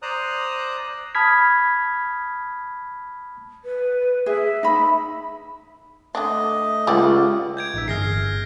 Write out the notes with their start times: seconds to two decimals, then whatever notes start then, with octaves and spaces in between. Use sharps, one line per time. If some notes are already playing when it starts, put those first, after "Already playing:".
0.02 C5 D5 A#5 D#6 F#6
1.15 A5 B5 D#6 F6 G#6 B6
3.65 B4
4.26 G#4 E5
4.63 D#4 B5
6.15 D3 A3 D4 D#5
6.87 C#2 G4 D5 F#5
7.57 G6 G#6 D7
7.74 A1 D#4 E5
7.88 G1 G#4 F6 A#6 C7